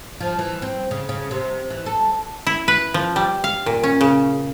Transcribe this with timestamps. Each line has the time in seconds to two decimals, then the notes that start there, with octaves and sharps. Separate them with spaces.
0.21 F3
0.39 E3
0.62 C4
0.91 C#3
1.09 C#3
1.31 C3
1.70 E3
1.86 A4
2.47 E4
2.68 B4
2.94 F3
3.16 G3
3.44 F5
3.66 A#2
3.83 C#4
4.01 C#3